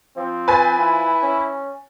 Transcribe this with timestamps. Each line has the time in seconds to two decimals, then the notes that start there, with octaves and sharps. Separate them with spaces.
0.17 F3 C4
0.48 B4 G#5 A6
0.80 E4
1.23 C#4